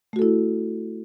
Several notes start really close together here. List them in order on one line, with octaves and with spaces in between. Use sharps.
A3 F#4 A4 E4